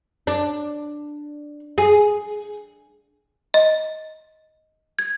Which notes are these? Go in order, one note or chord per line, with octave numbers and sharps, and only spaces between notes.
D4
G#4
D#5
G#6